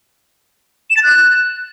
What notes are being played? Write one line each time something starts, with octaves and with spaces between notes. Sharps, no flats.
E7
A6
F#6